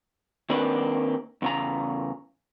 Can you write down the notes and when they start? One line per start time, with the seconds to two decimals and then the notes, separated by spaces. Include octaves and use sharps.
0.50 D#3 A#3 C4 D4 B4
1.42 E2 C#3 A#5